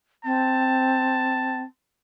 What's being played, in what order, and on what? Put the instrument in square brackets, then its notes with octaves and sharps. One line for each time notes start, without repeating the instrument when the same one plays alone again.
[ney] C4 [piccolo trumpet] A5